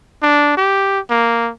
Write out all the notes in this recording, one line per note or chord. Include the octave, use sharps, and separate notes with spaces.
D4
G4
A#3